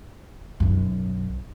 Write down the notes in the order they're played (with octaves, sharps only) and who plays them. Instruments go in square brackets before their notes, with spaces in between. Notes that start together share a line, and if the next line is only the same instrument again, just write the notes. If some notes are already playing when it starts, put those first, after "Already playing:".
[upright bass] B1 F#2